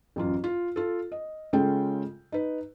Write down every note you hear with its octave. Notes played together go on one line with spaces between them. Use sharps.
A1 F#2 F4
F4
F4 A4
D#5
C#3 G#3 C#4 F4 A4 G5
D#4 B4